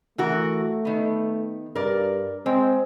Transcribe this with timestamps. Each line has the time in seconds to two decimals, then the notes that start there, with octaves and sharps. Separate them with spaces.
0.18 E3 A3 F#4 A#4
0.85 D#3 B3
1.75 G2 A#4 D5
2.46 G#3 C4